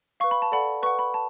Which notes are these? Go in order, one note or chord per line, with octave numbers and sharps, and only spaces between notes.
B4 F5 C#6
B5
A5
A4 D5 F#5 B5
B4 F#5 C#6
B5
A5